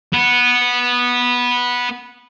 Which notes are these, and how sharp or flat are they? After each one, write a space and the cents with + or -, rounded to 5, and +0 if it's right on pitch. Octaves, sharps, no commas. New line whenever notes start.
B3 -10